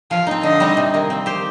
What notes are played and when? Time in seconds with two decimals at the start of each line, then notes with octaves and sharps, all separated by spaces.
0.11 F3 F5
0.27 C4 D#4
0.43 D3 D#5
0.60 G3 C4 D#4
0.77 C3
0.94 D#3 A#3
1.10 C4
1.26 G4 C5